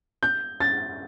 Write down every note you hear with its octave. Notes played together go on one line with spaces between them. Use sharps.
G6
A6